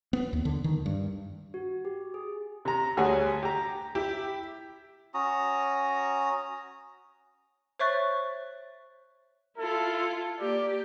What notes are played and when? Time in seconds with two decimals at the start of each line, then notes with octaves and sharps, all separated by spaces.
0.13 B3
0.33 D#2
0.45 D3
0.64 D#3
0.86 G2
1.54 F#4
1.85 G4
2.14 G#4
2.65 C3 A#5
2.97 D2 G3 F#4 G#4 C#5
3.43 G4 A#5
3.95 E4 G4
5.14 C#4 F#4 A#5 D#6
7.80 C5 C#5 E5 C#6 F#6 A6
9.58 E4 F4 A4
10.40 A#3 G4 D5